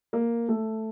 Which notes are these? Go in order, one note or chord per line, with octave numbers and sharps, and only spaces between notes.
A#3
A3